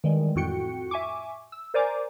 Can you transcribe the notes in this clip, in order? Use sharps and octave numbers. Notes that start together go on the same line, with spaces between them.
D#3 E3 G3 G#3
F2 A2 F#4 G5 C#7
E5 G#5 C#6 D6
E6
A#4 C5 D5 G#5 A#5 D6